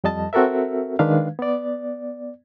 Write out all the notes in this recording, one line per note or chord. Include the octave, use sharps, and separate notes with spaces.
F2 G3 D#5 A5
C4 F#4 A4 A#4 E5
D#3 G#3 D4 B4 F5
B3 D5